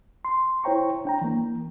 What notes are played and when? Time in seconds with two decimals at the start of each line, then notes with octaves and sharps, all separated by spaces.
0.25 C6
0.64 E4 C5 C#5 G5 A#5 C#6
1.05 D4 G5 A#5
1.21 E3 A#3